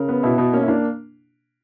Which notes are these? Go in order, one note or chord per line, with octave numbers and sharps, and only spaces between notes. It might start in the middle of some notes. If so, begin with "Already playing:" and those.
Already playing: C#3 A#4
B3
B2 E4
B2
A#3 C#4
E4
A#3 D4